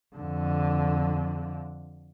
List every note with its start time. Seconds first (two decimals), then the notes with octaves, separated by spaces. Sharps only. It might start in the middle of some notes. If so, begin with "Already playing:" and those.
0.16 F2 D3